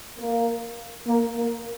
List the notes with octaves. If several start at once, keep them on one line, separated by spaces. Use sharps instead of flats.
A#3
A#3
A#3